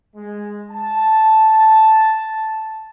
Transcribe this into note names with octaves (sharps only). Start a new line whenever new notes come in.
G#3
A5